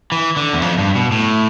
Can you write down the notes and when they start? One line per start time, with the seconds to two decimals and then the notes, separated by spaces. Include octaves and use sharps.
0.12 E3
0.37 D3
0.53 E2
0.62 F2
0.78 G2
0.95 B2
1.12 A2